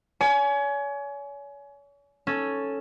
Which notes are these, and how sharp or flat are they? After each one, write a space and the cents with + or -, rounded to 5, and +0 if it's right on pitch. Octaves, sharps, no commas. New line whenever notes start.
C#5 +40 G#5 +25
C#4 +0 A4 +0